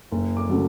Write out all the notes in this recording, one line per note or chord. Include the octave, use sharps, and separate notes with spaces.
F#1
D6
C#3 F#3 A3